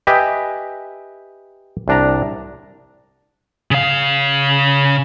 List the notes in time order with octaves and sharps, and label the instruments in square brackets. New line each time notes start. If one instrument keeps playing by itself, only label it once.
[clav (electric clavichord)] G4 B4 D#5 E5 G5 G#5
C2 D4 A#5
[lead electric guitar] C#3 F5